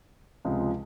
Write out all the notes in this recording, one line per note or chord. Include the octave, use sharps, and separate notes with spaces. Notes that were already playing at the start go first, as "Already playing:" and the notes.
C#2 C3 F3 G#3